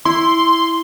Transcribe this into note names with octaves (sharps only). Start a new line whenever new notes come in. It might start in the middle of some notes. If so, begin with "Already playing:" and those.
E4 C6